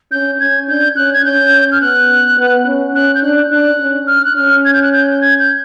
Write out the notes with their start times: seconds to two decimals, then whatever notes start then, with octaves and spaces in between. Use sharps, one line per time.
0.12 C#4 G6
0.40 C#4 G#6
0.68 D4 G6
0.96 C#4 F#6
1.14 G#6
1.25 C#4 G6
1.72 F6
1.81 B3 F#6
2.38 B3
2.66 C#4
2.95 C#4 F#6
3.15 G6
3.23 D4 F#6
3.51 D4 F#6
3.79 C#4
4.07 F6
4.25 F#6
4.36 C#4 F6
4.65 G#6
4.73 G6
4.82 F#6
4.93 G6
5.11 G6
5.21 G#6
5.39 G6